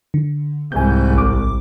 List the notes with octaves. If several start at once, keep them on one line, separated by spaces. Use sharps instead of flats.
D3
C2 G#2 G#5 G6
A1 D6